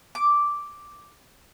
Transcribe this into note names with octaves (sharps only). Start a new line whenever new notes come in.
D6